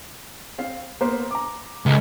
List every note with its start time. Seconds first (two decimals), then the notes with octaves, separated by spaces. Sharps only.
0.58 C4 F5 C7
1.01 A#3 B3 C5
1.31 A#5 D6
1.86 C#2 F4 A4